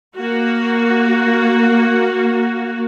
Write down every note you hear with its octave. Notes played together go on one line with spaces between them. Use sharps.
A#3 F#4